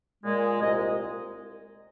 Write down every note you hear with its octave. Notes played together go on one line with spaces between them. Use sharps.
A#2 G#3
C2 A#2 G#3 D#5